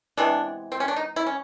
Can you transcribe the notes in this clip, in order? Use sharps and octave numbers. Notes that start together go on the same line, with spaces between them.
C3 E3 G#3 B3 D4
C4
C#4
D4
D#4
E4
C#4